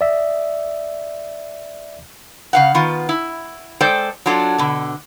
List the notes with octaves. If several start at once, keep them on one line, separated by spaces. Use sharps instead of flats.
D5 E5
C#3 F5 F#5
D#3 B3 F4
E4
G#3 A4 C5 D5 G5
F#3 D4 F4 A4
B2 D3